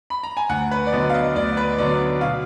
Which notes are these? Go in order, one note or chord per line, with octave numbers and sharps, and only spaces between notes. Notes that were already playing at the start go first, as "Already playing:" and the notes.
B5
A#5
G#5
D2 F#5
B4
D5
D3 F#3 B3 D#5
F5
D#5
D2 D5
B4
D3 F#3 B3 D5
B2 F5